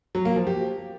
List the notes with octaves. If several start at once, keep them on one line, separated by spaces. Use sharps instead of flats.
F#3
A#3
F3
G4